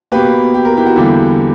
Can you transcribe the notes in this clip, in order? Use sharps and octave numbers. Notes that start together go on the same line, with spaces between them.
B2 A#3 G4 B4
G4
A#4
E4 G4
F#4
E2 D3 G3 A#3 E4 G4